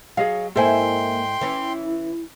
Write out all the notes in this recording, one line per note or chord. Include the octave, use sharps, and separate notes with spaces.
F#3 G#4 D#5 F5
G#2 A#3 E4 A4 C5 G5 G#5 C6
E3 C#4 E4